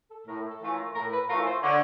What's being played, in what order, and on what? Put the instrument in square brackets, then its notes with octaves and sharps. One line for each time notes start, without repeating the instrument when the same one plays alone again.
[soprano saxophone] A4
[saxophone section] A2 [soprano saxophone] A#4
[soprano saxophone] A4
[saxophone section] E3 A3 C#4 F4
[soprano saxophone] A#4
[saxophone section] A2 [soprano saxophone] A#4
[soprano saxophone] B4
[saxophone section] E3 A3 C#4 F4 [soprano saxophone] A#4
[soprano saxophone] C5
[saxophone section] D3 [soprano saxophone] C#5